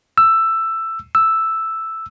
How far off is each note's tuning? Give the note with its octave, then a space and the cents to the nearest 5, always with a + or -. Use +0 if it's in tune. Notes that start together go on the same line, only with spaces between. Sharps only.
E6 +10
E6 +0